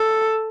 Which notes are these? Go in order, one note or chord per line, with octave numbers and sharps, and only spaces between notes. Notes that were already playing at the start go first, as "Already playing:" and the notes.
Already playing: A4